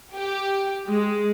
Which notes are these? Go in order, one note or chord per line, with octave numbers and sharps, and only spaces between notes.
G4
G#3